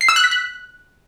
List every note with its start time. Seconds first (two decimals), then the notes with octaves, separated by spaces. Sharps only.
0.01 C7
0.08 E6
0.16 F#6
0.24 B6
0.31 F#6